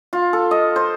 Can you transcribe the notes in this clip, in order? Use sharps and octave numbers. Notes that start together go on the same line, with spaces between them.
F4
A4
D#5
C5